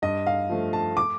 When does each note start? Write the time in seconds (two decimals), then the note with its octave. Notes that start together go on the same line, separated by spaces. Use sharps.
0.02 G2 D#5
0.27 F5
0.49 F3 A3
0.73 A5
0.97 D6